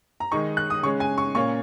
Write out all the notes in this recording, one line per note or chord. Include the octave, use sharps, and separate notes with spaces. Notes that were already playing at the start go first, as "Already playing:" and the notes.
A#5
D#3 G#3 D#4 C#6
F#6
D#6
C#3 G#3 C#4 C#6
G#5
C#6
A#2 A#3 C#4 C#6